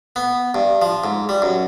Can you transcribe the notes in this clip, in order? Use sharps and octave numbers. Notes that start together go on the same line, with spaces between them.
B3
G2
F3
G#2
G3
F#2